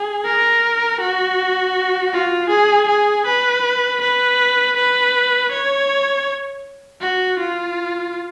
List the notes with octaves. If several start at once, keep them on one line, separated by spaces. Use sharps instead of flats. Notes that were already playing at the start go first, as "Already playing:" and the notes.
Already playing: G#4
A#4
F#4
F4
G#4
G#4
B4
B4
B4
C#5
F#4
F4